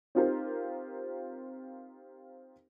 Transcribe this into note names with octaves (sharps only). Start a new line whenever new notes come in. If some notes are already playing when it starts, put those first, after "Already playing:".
C4 D#4 F4 G4 A#4 C5